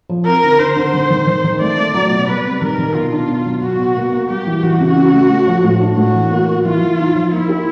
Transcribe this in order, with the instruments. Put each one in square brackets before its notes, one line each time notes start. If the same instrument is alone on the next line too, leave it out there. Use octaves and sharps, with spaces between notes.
[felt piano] F3
[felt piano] C4 [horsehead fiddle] A#4
[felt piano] D3
[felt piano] D3 [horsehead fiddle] C5
[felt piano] D3
D#3
D#3
D#3
D#3
[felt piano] A3 [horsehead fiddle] D5
[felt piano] A3
F#3
B2
[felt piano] G3 [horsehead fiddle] B4
[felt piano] C3
[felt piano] D#3 [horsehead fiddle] A#4
[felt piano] D#3
[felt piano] B2 [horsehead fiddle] F4
[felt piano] D4
B2
F#3
[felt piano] B2 [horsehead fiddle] F#4
[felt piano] B2
A#3
A#3
[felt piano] G3 [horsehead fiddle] G4
[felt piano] E3
[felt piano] E3 [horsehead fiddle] F#4
[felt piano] C#3
C#4
A3
A3
F3
A2
D4
[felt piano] A2 [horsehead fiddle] F#4
[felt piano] E3
A#3
A#3
[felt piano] E3 [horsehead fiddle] F4
[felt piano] E3
D#4
F3
[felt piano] A#3 [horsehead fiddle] E4
[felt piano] G4